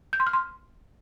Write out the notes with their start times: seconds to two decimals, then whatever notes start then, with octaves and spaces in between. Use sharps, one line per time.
0.13 G6
0.20 C6
0.27 F6
0.33 C6